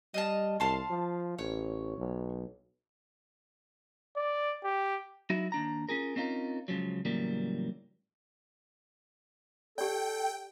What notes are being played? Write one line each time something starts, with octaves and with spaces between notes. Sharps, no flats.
G3 D#5 F5 A5
C2 F5 A5 C6
F3
A1 C#5
B1
D5
G4
F#3 D#4 E4 F#4
D#2 D4 A#5
C#4 F4 G#4 A#4
C4 C#4 D#4 F4 A#4
C#2 C#3 F3 F#3
A2 C#3 E3 F#3 G3 A#3
G4 A4 D5 G5